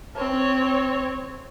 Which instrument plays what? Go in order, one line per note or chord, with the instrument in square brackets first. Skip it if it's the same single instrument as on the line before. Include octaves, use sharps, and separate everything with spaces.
[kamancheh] C4 C#5